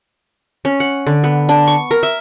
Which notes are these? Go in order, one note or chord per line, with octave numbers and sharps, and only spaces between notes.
C#4
F#5
D3
B3
D4
C#6
A#4
E5